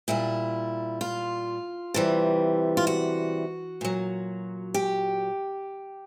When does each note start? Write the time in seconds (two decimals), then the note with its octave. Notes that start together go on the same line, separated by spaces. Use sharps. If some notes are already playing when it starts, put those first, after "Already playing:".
0.08 A#2 G3 E4
1.01 F4
1.94 C3 E3 G3
2.77 F4
2.87 F#4
3.81 A#2 F#3
4.74 G4